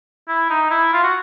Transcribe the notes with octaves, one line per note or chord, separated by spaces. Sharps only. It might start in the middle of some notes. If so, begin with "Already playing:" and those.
E4
D#4
E4
F4
F#4